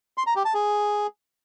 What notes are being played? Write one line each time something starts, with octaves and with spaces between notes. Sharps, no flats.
C6
A#5
G4
A5
G#4